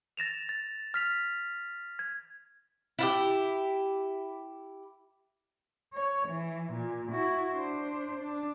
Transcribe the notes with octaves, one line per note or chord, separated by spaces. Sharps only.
A6 A#6 E7 F7
A6
F6 B6 F7
G#6
E4 F4 G4
C#5
E3
A#2
E4 F#4
D4 C5
D4